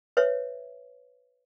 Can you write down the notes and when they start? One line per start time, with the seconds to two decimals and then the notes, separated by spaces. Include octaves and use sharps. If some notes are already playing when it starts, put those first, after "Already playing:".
0.17 B4 C#5 E5